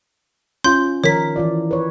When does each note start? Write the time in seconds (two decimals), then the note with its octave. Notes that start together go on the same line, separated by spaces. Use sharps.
0.64 C#4 F4 C6 G6
1.04 D#3 F3 A#4 C#5 B6
1.36 E3 F4 D5
1.71 B4 C#5